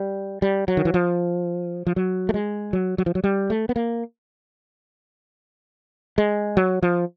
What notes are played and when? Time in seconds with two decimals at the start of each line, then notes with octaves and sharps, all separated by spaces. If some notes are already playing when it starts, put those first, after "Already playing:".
Already playing: G3
0.42 G3
0.68 F#3
0.77 D#3
0.85 E3
0.94 F3
1.87 F3
1.96 F#3
2.29 A3
2.34 G#3
2.73 F#3
2.98 F#3
3.06 F3
3.15 F#3
3.24 G3
3.50 A3
3.69 B3
3.76 A#3
6.18 G#3
6.57 F#3
6.82 F3